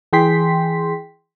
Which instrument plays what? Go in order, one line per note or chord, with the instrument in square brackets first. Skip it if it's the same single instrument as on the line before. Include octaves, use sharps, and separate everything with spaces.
[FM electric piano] E3 G#4 G5 C6 B6